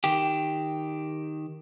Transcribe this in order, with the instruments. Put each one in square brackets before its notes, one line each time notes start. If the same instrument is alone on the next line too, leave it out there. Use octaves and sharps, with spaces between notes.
[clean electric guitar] D#3 G4